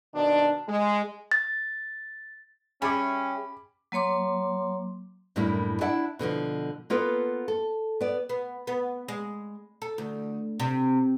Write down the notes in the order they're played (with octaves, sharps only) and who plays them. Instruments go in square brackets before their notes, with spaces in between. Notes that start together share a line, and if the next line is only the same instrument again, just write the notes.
[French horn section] B2 D#3 D4
G#3
[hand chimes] A6
[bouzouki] G3 G#4 E5 [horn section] C#4 [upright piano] B5 D6
[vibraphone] F#3 A#3 C#5 C6 D6
[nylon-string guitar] F#2 A2 G3 A#3 D4 E4
D4 E4 D5 E5 F#5 A5
B2 D3 D#3 F3
A#3 B3 F4 A4 B4
A4
B3 D5
[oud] B3
B3
G#3
A4
D2
C3